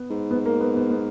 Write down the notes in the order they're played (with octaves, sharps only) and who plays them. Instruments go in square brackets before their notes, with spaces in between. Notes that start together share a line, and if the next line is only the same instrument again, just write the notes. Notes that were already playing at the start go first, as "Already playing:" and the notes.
Already playing: [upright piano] B3
[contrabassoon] G#2
[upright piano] B3
A#3
B3
B3
B3